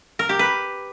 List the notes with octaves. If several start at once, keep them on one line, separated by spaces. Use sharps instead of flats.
A#4
G4
B4